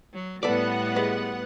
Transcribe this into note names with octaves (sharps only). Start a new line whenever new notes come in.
F#3
A2 G3 B3 A4 B4 D5 F#5
G#3 B4